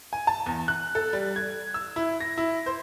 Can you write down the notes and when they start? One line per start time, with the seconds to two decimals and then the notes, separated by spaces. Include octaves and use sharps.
0.13 G#5
0.27 A5
0.46 E2
0.68 F#6
0.95 A4
1.13 G3
1.36 G#6
1.74 E6
1.96 E4
2.20 A#6
2.38 E4
2.66 C5